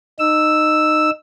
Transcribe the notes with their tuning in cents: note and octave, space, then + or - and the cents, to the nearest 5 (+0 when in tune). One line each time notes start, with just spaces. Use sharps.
D#4 -20 E6 +0